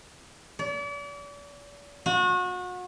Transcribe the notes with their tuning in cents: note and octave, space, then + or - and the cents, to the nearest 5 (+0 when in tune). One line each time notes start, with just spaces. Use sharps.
D5 -40
F#4 -35